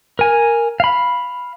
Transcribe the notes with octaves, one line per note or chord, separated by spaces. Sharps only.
A#4 G#5
F5 B5